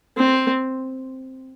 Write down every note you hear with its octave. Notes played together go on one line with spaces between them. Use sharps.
C4